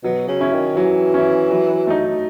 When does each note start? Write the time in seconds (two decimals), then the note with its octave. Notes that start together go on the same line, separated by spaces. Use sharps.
0.04 B2 F#3
0.28 C#3
0.40 C#4 E4
0.53 D#3
0.76 E3 F#3
1.14 C#4 E4
1.51 F#3
1.87 A3 D#4